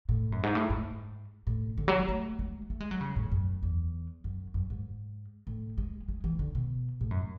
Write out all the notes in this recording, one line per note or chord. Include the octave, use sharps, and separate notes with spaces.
A2
F#2
G#2
A2
G#2
A2
D3
F#3
G#3
A3
G#3
A3
G#3
F#3
C#3
A2
F#2
E2
F#2
F#2
G#2
A2
G#3
G#3
E3
D3
B2
A2
F#2